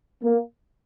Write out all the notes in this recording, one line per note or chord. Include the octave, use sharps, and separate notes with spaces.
A#3